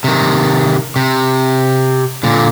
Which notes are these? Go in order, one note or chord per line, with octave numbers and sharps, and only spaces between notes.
C3 D#3
C3
A#2 D3